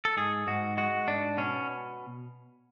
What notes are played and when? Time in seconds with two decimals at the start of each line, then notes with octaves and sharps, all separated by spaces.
0.05 A4
0.17 G#2 G#4
0.47 G#2 F#4
0.77 G#3 F#4
1.08 G#2 D4
1.37 B2 C#4